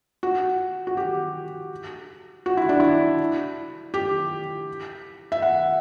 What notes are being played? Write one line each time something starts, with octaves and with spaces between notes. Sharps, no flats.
F#4
F#4
G4
F#4
E4
D4
E4
G4
E5
F#5